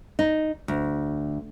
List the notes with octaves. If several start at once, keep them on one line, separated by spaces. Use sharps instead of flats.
D#4
D2